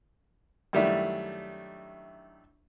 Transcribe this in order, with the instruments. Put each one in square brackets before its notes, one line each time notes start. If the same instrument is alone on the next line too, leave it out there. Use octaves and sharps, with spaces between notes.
[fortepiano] F#2 D#3 G3 A3 D4 E4